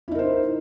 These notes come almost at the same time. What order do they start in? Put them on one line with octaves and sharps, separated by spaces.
E4 D#4 A#4 C5